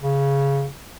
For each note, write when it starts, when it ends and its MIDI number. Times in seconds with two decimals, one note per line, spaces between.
0.02 0.66 49